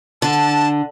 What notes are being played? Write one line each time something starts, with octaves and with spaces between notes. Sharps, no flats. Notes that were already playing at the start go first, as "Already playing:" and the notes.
D3 A5